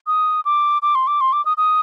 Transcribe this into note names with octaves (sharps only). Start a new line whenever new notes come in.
D#6
D6
D6
C6
D6
C6
D6
D#6
D#6